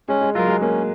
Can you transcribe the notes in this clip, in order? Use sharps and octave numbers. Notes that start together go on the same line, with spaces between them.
G#3 C#4
G#3
F#3 F4 A#4
G#3
A#3 C#4